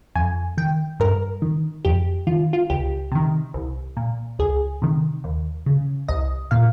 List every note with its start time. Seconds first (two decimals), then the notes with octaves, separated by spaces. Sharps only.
0.16 F2 G#5
0.58 D#3 G5
1.00 G2 A#4
1.42 D#3
1.85 F2 G4
2.27 D#3 F4
2.53 F4
2.70 C#2 G4
3.12 C3 D#3
3.54 C2
3.97 A#2
4.39 C#2 G#4
4.82 C3 D#3
5.24 D#2
5.66 C#3
6.08 C2 D#5
6.51 A#2 F5